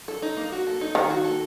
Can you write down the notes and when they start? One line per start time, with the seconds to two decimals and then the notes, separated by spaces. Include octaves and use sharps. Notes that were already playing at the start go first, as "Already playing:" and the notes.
0.08 A4
0.22 D#4
0.37 A#3
0.52 F#4
0.67 A4
0.81 D#4
0.95 D#3 A#3
1.10 F#4
1.24 A4